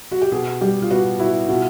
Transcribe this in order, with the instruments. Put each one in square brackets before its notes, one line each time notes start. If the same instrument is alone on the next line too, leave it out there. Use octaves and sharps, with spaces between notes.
[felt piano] F#4
G4
[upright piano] B2 [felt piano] G#4
[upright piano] G3 [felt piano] G4
[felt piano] F4
[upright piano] B3 [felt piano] F#4
[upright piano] E4 [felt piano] F#4
[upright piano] B2 [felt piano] F4